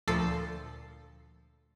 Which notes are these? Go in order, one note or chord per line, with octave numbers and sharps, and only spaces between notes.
D2 A#2 F3 A4 A6 C7